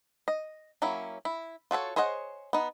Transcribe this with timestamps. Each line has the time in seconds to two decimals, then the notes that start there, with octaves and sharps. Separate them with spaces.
0.28 D#5
0.82 F#3 A#3 C#4 E4
1.25 E4
1.71 F4 F#4 A4 C#5
1.96 G#4 C5 C#5 D#5 F#5
2.53 B3 D#4